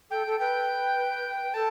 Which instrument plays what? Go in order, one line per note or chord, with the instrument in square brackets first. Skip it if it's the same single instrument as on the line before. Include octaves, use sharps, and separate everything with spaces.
[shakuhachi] A4 [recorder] G5
[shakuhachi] A4
[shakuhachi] B4 [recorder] G5
[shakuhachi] A4 [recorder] A5